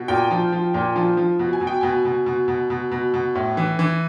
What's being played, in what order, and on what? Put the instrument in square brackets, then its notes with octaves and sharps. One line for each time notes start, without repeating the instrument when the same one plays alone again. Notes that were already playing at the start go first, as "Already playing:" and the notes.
Already playing: [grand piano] B2
A#2 G5
F3
F3
A#2
F3
F3
B2
G#5
B2
G5
B2 G#5
B2
B2
B2
B2
B2
B2
A2
E3
E3